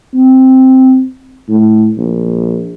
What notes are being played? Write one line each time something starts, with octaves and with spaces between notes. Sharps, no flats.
C4
A2
A#1